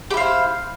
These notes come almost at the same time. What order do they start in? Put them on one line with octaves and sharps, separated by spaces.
G4 E4 F5 C5